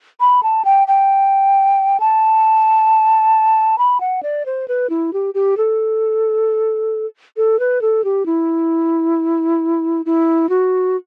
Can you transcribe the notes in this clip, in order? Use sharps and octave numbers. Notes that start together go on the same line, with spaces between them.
B5
A5
G5
G5
A5
B5
F#5
D5
C5
B4
E4
G4
G4
A4
A4
B4
A4
G4
E4
E4
F#4